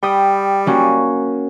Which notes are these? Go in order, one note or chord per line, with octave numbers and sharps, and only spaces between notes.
G3 G5 B5 D#6
A#3 C#4 F#4